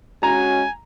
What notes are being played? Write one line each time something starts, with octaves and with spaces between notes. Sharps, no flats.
G#3 C#4 F#4 G#5 A#5